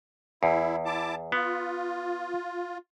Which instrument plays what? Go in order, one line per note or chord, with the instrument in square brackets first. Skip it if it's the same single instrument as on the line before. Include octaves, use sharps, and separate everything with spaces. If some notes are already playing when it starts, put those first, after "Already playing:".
[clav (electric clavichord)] E2 [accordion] E4
[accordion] E4 A5 D6
[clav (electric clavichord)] B3 [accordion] F4